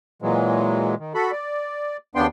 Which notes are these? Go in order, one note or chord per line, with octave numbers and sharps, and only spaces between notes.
A#2 E3 F#3 G#3
D#3
F#4 A4 B5
D5
D#2 C#3 B3 D4 G5 C6